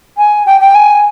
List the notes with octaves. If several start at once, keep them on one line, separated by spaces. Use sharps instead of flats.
G#5
G5
G5
G#5